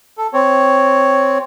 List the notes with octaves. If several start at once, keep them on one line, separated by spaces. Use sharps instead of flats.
A4
C4 C#5